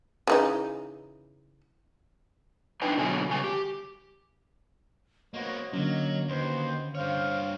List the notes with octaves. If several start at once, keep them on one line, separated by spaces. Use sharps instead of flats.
C#3 E3 D#4
D4 D#4 B4 D#5 G5 G#5
B2 D3 F#3 A4 G#5
C#3 G3 G#5
G4
A#3 B3 F#4 C5 C#5 D#5
D3 F#3 A#3 C#4
D#2 F#4 B4 C5
G2 C5 C#5 F5